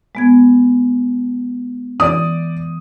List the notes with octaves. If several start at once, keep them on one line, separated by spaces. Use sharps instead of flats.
G#3 B3 G#6
E3 D5 D#6